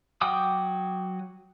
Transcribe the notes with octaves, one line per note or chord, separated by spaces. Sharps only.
F#3 F#5 G5 D6 D#6